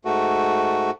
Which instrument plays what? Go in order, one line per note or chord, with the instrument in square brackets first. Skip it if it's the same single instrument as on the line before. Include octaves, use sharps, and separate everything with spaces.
[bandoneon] G#2 A3 F#4